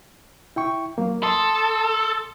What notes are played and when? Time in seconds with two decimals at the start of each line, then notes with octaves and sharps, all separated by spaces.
0.56 E4 G5 C#6
0.98 F#3 A#3
1.23 A4 C6 D#6